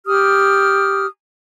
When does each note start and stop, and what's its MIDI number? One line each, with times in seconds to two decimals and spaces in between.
0.06 1.07 67
0.06 1.07 87
0.06 1.07 89